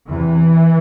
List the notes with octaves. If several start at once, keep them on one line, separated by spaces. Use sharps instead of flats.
E2 C3 E3